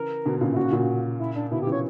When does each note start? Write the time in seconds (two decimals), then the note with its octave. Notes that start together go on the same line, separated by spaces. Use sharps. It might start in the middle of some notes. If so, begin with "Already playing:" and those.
Already playing: C#3 E3 A#4
0.25 B2 D3
0.41 A#2 C#3
0.53 E4
0.56 A#2 C#3 F#4
0.72 A#2 C#3
1.19 E4
1.35 D4
1.51 B2 D3 E4
1.62 G4
1.67 C#3 E3
1.72 C#5